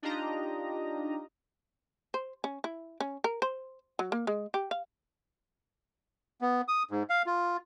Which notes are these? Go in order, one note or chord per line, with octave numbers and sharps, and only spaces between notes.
D4 D#4 F4 G4 D#5 A#5
C5
C#4
E4
C#4
A#4
C5
F#3
A#3
G#3
G4
F5
B3
D#6
G#2
F5
F4